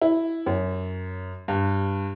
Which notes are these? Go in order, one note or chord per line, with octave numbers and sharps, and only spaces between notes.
E4
F#2
G2